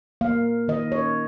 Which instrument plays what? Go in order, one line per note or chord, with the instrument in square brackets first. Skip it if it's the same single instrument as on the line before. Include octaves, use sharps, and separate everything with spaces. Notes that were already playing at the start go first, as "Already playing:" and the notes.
[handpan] A#3 F5
D#3 D#5
C#5